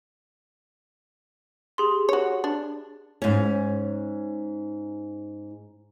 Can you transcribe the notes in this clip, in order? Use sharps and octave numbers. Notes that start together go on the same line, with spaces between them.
G4 G#4 C6
F#4 C#5
D4
G#2 C#4